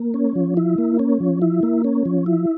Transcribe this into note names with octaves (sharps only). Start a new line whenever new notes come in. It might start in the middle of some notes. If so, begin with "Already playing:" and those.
Already playing: A#3
C#4
F3
E4
A#3
C#4
F3
E4
A#3
C#4
F3
E4